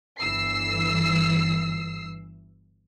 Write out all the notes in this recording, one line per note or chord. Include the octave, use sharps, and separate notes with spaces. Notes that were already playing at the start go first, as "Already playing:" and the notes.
G1 E3 E6 C7